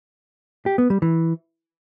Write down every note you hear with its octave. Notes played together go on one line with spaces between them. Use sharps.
G4
B3
G3
E3